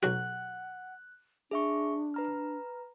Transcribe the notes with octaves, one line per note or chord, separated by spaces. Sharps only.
B1 F#4 F#5 F#6
D4 G#4 E5 C#6
B4 A#5 F6